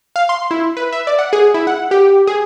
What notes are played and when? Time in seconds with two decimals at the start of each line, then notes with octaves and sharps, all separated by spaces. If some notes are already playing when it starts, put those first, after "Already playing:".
0.16 F5
0.29 C6
0.51 E4
0.77 B4
0.92 E5
1.07 D5
1.19 F#5
1.33 G#4
1.54 E4
1.67 F#5
1.91 G4
2.27 G#4